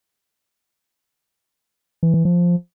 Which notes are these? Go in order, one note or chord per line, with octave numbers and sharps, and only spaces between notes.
E3
E3
F3